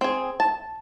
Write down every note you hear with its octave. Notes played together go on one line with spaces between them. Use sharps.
C4 G#4
A5